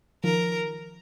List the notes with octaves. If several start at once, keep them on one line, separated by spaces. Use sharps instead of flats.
D#3 F3 A#4